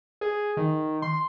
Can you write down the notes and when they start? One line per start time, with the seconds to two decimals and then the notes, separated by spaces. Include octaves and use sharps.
0.21 G#4
0.57 D#3
1.02 C6